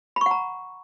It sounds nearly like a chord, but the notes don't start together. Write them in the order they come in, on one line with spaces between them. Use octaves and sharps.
B5 C#6 F#5 A#5